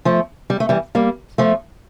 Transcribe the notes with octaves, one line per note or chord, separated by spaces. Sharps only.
F3 A3
G3
A3
E3 G3
G3 A#3
F3 A3